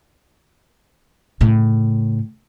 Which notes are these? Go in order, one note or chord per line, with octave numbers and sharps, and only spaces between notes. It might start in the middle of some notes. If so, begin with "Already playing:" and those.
A2 C#3